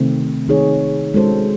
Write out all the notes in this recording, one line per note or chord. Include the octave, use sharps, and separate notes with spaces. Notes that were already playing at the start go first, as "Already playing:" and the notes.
Already playing: C3 D#3 A3 C4
D#3 A3 D#4 G#4 C#5
G#3 C#4 F#4 A4 C5